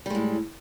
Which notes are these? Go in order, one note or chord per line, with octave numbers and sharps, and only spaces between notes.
A2 G3 G#3